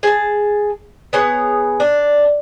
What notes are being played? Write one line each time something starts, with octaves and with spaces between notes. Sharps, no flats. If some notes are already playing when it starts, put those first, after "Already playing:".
G#4 A5
B3 G#4 C#5 F#5
D4